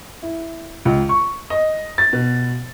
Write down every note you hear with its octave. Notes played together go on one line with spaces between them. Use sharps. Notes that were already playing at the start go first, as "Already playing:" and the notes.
E4
C#2
C#6
D#5
A6
B2